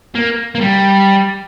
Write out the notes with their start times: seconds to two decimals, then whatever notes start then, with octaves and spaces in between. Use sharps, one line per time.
0.15 A#3
0.55 A#3
0.61 G3